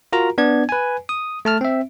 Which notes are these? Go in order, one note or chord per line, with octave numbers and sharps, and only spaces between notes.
F4 F#4 A#4 A#5
B3 D4 D5 G#6
B4 G#5
D#6
A3 A5 F6
C4 E5